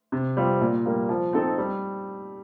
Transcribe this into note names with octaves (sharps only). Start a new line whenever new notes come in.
C3
G3 C4 F4
A#2
G3 A#3
F3
C4 D#4 A4
G3